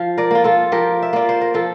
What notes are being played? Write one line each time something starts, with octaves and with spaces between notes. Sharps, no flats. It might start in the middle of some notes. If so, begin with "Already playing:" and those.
Already playing: F3 F5
A#4 D5
A#3 F4
F4 A4
F3 G4 A#4
E5
A#3 F4 D5
C5
A#4
F3 F4 A4